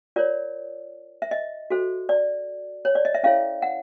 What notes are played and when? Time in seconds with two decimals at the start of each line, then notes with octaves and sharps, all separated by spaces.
0.16 F4 A#4 C#5 D5
1.22 E5
1.31 D#5
1.70 F#4 A4 C5
2.09 D5
2.85 C#5
2.95 D5
3.05 D#5
3.14 E5
3.23 C#4 E4 A4 C#5 F5
3.62 F#5